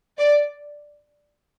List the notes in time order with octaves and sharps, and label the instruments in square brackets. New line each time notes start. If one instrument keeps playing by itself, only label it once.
[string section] D5